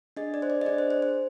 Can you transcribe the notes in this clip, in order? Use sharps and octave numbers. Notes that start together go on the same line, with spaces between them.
D4 G#4 D#5
D5
C5
D5
D#5
D4 G#4 D5
C5
C5
C5